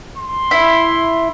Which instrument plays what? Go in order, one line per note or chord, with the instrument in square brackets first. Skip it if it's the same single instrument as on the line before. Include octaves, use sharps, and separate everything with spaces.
[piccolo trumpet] C6
[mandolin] E4